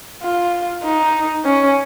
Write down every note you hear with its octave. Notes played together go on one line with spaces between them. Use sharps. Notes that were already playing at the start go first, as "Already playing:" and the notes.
F4
D#4
C#4